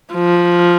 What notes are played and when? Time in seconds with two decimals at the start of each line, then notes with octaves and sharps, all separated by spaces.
0.14 F3